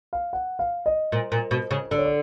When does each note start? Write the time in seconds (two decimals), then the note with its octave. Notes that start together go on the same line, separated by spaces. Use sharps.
0.13 F5
0.33 F#5
0.59 F5
0.86 D#5
1.12 A#2
1.32 A#2
1.51 B2
1.71 C#3
1.91 D3 D5
1.98 C#5
2.05 D5